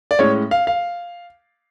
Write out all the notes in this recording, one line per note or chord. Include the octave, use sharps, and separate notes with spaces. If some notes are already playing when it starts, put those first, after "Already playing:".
D5
A2 G#3 C#4 C#5
F5
F5